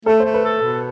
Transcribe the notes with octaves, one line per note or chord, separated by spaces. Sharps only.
A3 A4
C5
A3
B4
A4
B2